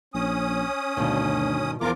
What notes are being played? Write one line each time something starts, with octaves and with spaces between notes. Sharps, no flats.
A#1 C#4 D#6
D2 G2 B2 D#3
E2 F3 F#3 F4 A#4 D6